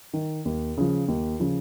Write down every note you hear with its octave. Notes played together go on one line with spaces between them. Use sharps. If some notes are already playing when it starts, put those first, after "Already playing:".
D#3
D#2
C#3 F3
D#2
C#3 F3